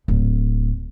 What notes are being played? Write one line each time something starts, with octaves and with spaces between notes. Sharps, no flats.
D1